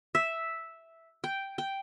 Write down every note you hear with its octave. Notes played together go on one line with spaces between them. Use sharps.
E5
G5
G5